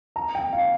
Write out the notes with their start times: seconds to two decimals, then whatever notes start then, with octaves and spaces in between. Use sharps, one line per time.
0.16 A#5
0.35 G5
0.53 F5